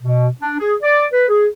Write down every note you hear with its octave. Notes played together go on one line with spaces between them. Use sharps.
B2
D4
G#4
D5
B4
G#4